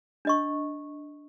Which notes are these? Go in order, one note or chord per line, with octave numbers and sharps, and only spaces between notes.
D4 D#5 C#6